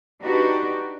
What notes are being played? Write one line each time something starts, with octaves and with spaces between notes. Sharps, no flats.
D4 D#4 F#4 G4 B4